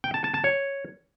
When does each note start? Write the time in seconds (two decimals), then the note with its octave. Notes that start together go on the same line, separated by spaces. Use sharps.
0.04 G5
0.14 A5
0.24 A5
0.34 A5
0.44 C#5